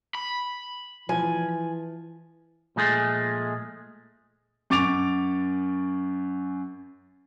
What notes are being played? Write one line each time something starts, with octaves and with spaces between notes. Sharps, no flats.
B5
E3 F3 G#5
A#2 F3 G#3 A3 G#4
F#2 C#6 D6 A6 D7 F7